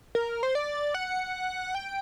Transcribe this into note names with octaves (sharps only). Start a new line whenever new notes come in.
A#4
C5
D5
F#5
G5